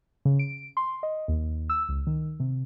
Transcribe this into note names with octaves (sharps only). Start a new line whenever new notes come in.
C#3
D7
C6
D#5
D#2
E6
C#2
D#3
C3